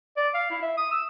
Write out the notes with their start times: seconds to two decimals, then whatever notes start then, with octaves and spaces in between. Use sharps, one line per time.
0.17 D5
0.34 F5
0.51 E4
0.62 E5
0.77 D#6
0.92 E6